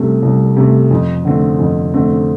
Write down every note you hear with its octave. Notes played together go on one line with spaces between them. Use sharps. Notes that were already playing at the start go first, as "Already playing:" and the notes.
Already playing: C2 C3 A3
C2
C3 A3
F2
D3 A3 C4
F2
D3 A3 C4